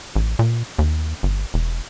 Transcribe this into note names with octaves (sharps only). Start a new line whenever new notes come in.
A1
A#2
D#2
G1
E1